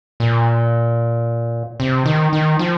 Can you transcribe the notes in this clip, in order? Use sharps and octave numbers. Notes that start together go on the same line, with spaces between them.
A#2
C3
D#3
D#3
F3